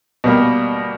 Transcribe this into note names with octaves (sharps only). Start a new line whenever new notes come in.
B2 G3 A#3